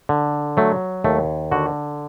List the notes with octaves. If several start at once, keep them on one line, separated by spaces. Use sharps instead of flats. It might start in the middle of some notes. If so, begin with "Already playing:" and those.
D3
F#3 A3
D#2 A3
D3 F#4